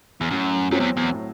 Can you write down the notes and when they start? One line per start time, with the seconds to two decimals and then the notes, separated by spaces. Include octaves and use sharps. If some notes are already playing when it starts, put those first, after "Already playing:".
0.21 E2
0.30 F#2 A2
0.71 F#2 F#3 C4
0.80 E2
0.97 E2
1.13 A2